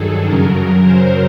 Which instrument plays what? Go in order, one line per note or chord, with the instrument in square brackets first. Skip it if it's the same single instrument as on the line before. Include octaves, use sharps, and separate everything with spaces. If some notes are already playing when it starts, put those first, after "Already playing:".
Already playing: [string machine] G2 D#3 F#3 G#4 A4
F#2 C#3 F#3 A#4
C5